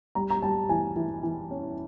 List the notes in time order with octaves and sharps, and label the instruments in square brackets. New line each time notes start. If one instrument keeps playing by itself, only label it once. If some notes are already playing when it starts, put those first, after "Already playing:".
[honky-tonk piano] G3 [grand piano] A#5
[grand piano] A#5
[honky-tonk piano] G3 [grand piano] A5
[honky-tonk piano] E3 [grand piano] G#5
[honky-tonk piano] E3
E3
C#4